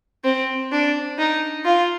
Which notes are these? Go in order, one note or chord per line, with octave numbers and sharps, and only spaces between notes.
C4
D4
D#4
F4